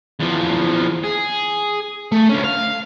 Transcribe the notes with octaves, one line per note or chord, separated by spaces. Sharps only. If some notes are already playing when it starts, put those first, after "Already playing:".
E2 F3
G#4
A3
D2 C#4
F5